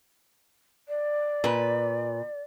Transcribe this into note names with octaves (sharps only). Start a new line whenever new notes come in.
D5
A#2 B4